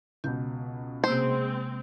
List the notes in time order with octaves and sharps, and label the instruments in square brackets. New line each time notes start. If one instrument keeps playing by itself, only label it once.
[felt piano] C#2 B2 [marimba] G6
[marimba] C3 A#3 [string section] G#3 C4 [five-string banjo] C5